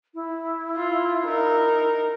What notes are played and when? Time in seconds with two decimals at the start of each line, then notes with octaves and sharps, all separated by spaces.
0.14 E4
0.77 F4
1.24 D#4 A#4